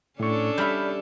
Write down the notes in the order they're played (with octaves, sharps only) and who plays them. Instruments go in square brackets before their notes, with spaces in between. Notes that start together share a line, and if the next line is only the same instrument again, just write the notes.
[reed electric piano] A2 C#6 [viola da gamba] C#4 D4 A4
[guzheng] G3 E5 [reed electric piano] B5 F6 G6